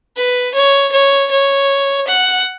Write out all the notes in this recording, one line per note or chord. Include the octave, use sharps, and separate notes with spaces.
B4
C#5
C#5
C#5
F#5